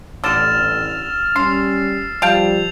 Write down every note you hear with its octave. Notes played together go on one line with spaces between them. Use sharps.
A1 D3 G3 E6 F6 A6 E7
G3 C#4 C6 C7
F3 G3 F5 G5 A5 G6 F7